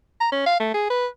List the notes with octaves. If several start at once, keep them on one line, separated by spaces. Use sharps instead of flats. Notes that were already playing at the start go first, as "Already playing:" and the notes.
A#5
C#4
F5
A3
G#4
B4